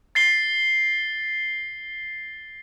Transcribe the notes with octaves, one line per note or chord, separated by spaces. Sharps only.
A6 C7 G7